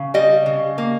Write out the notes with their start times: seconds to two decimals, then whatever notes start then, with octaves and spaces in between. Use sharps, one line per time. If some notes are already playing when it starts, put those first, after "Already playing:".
Already playing: C#3
0.14 G3 D#5
0.46 C#3
0.78 A#3